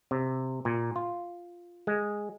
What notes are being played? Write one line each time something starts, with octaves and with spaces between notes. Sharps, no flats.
C3
A#2
F4
G#3